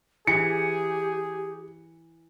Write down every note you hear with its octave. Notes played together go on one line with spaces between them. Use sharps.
E3 G4 G#4 C#7